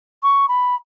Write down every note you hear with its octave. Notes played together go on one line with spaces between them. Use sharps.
C#6
B5